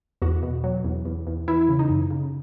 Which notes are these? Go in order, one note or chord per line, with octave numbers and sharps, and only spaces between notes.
E2 F#4
B2
F#3
E2
E2
E2
E3 E4
C#3
D#4
F#2
C#3